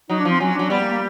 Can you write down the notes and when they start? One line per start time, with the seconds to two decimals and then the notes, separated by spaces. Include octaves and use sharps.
0.10 F#3 D#4
0.20 D4
0.25 F3 C4
0.40 F#3 C#4
0.55 F#3 D4
0.70 G3 B3
0.81 A#3
0.91 A#3